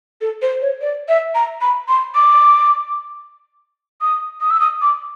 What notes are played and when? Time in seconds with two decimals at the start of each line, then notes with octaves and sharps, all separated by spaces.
0.21 A4
0.42 C5
0.61 C#5
0.81 D5
1.08 E5
1.35 A#5
1.61 B5
1.88 C6
2.15 D6
4.01 D#6
4.41 D#6
4.50 E6
4.61 D#6
4.81 D6